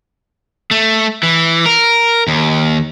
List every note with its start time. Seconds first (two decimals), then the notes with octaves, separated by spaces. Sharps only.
0.71 A3
1.23 E3
1.66 A#4
2.28 D#2